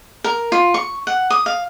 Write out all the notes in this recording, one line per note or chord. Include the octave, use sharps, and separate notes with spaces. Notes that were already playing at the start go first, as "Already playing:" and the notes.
A#4
F4
C#6
F#5
D#6
F5